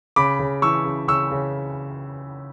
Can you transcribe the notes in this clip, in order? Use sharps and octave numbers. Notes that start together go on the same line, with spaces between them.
C#3 B5 D6
C#3
E3 C#6 E6
C#3
C#3 C#6 E6
C#3